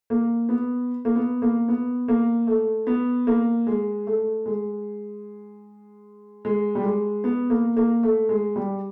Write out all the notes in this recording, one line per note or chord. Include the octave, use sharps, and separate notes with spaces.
A#3
B3
A#3
B3
A#3
B3
A#3
A3
B3
A#3
G#3
A3
G#3
G#3
G3
G#3
B3
A#3
A#3
A3
G#3
G3